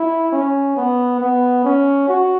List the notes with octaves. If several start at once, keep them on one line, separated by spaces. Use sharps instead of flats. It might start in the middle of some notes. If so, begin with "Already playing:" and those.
Already playing: E4
C#4
B3
B3
C#4
F#4